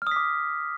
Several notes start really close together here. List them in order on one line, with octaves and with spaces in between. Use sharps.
F6 D#6 B6 D6